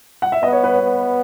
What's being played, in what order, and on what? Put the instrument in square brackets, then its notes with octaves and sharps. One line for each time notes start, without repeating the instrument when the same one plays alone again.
[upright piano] F#5
E5
[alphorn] B3 [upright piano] D#5
[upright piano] C#5
B4
C#5
[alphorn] B3